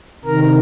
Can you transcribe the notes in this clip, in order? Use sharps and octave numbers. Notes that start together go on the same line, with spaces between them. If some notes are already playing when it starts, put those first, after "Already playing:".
C3 D#3 A#4